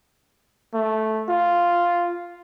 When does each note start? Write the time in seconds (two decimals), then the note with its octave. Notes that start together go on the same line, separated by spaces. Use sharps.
0.74 A3
1.29 F4